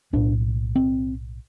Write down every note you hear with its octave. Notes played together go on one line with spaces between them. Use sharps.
B1 A2 D4
C4